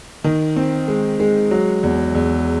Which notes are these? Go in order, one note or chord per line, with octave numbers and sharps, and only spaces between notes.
D#3
C4
G#3
G#3
F#3
E2
E2